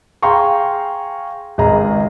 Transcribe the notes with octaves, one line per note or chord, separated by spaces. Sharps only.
G#4 F5 G5 A#5 C6 C#6
G#1 C#2 G#4 A#5